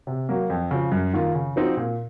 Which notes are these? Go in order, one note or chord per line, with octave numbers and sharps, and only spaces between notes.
C3
F#3 A#3
F2
C#3 F3
F#2
D#3 A#3 F4
C#3
F3 C4 D#4 F#4
A#2